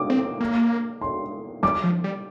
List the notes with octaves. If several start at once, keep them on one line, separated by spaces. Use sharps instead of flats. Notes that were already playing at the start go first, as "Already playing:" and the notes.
Already playing: D6
C4
A#3
C6
G3 D6
F3
G3